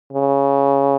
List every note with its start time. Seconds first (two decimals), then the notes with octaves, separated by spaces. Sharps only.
0.13 C#3